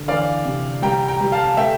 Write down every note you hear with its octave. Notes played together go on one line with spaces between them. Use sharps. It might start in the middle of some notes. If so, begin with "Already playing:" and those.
Already playing: D3
E3 D5 F5
C3
G3 G5 A#5
G5 A#5
G3
F5 A5
A3 E5 G5